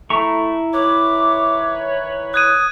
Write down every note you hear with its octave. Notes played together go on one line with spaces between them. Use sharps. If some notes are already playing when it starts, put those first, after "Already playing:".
A3 E4 A#5 C#6
D#3 B4 C#5 D6
D#6 F#6 G#6 D#7